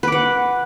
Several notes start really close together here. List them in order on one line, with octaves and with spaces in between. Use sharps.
B4 D6 F#5